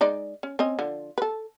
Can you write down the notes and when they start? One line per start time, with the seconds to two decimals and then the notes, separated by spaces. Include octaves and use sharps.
0.01 G#3 D#4 D5
0.43 C#4
0.59 C4 C#4 D#5
0.79 D3 F3
1.18 A4 B4